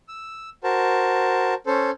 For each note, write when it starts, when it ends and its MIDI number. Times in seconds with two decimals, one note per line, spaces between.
0.08 0.50 88
0.64 1.54 66
0.64 1.54 70
0.64 1.54 72
0.64 1.54 81
1.67 1.91 61
1.67 1.91 69
1.67 1.91 72